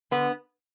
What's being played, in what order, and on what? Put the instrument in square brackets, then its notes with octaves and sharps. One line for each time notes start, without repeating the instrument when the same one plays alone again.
[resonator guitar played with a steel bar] D3 B3